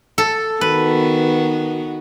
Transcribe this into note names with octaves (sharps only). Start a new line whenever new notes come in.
A4
D#3 B3 F#4 B4